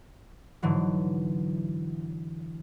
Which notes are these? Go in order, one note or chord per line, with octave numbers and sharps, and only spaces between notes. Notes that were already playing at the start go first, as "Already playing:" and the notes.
G#2 D3 E3 F#3